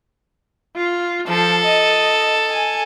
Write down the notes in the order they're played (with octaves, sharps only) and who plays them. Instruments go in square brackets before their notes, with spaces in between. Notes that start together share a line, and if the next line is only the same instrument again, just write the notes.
[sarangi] F4
[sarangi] F3 [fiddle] A4
[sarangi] D#5
G#5